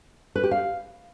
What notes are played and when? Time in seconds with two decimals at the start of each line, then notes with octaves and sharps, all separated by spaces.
0.35 B4
0.43 G4
0.51 F5